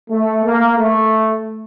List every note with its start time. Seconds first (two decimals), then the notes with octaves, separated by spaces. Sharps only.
0.11 A3
0.44 A#3
0.78 A3